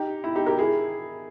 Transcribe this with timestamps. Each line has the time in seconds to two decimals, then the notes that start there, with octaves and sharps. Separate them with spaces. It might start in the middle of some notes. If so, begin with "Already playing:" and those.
Already playing: D#4 G4
0.24 E4
0.35 D#4 G4
0.46 G4 A#4
0.59 E4 G#4